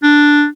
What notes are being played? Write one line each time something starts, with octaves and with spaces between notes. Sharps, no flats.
D4